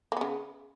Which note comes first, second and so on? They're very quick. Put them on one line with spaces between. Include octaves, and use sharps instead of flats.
A#3 B3 C#3